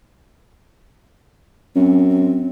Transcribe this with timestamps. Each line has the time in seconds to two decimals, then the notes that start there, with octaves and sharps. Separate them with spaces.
1.75 F#2 C4